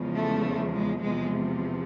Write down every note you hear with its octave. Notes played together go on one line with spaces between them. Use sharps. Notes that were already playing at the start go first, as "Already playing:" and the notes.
Already playing: E2 C#3 F3 G#3
A3
G#3
E2 C3 F3 G#3